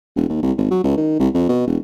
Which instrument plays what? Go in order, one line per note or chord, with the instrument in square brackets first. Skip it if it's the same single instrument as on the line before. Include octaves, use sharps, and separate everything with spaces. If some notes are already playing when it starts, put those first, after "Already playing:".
[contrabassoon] E1
D#2
C2
G#1
F#3
C#2
D#3
C2
F2
B2
E1